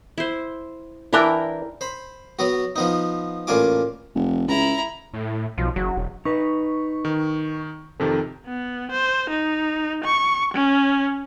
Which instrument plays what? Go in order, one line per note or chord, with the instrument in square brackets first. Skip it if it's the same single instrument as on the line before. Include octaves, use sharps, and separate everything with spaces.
[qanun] E4 C5
[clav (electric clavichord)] E3 D4 [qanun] E4 A#4 G5
[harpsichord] C5 B5
F#3 B3 F#4
F3 B3 D#4
A1 A#3 D4 F4 G#5 D6
[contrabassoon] F1
[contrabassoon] C#2 [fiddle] E4 A#5
[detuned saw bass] A2
[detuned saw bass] B1 [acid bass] F3
[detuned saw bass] F#1 [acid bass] F#3
[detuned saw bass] E1
[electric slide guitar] D#4 B4 [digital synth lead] C#6
[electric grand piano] D#3
[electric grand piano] F2 C3 D#3 [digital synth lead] A4
[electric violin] B3
C5
D#4
C#6
C#4